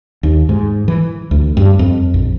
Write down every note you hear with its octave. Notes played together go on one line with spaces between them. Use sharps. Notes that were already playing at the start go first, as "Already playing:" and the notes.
D#2
G#2
E3
D2
G2
F2
A#1